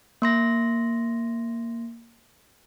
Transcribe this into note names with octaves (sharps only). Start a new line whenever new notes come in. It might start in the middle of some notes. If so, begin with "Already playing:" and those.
A#3 C6 A#6